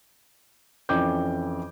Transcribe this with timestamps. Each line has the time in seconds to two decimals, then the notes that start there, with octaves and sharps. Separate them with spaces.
0.89 F2 E3 C#4 G5 D6 G6